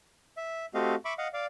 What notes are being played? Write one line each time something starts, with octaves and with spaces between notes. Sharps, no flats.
E5
A3 C4 F#4 G4 D#5 F5
E5 B5 C#6 D6
D#5 F5 F#5
D5 F5